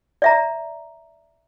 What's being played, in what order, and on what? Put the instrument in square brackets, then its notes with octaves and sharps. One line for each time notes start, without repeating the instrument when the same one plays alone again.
[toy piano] D5 E5 A#5